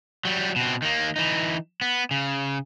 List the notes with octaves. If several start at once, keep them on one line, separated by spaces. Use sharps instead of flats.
F#3 G3
B2 C4
D#3 A#3
E3 D#4
B3
C#3